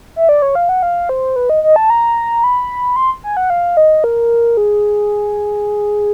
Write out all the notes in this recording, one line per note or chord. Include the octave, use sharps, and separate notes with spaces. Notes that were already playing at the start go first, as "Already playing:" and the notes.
E5
D5
C#5
F5
F#5
F5
C5
B4
D#5
D#5
A5
A#5
B5
C6
G#5
F#5
F5
D#5
A#4
G#4